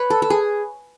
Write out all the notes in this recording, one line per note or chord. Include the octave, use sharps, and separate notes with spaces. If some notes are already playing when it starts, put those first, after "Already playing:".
Already playing: B4 C#5
A4
A4
G#4